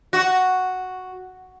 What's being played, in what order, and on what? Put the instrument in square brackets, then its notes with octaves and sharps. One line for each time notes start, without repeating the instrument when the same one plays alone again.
[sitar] F#4